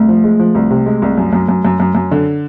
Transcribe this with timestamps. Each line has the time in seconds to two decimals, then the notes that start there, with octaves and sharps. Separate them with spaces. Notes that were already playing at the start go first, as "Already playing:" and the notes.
Already playing: C2 A3
0.08 F3
0.24 G#3
0.39 F3
0.55 C2
0.71 C3
0.86 G#3
1.02 C2
1.17 F#2
1.33 F#2
1.48 F#2
1.65 F#2
1.80 F#2
1.95 F#2
2.11 D3